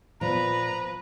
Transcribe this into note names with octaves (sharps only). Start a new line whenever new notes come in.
A#2 F3 B3 B4 A#5